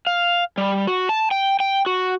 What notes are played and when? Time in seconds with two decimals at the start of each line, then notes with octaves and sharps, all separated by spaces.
0.07 F5
0.58 G3
0.87 F#4
1.09 A5
1.31 G5
1.60 G5
1.86 F#4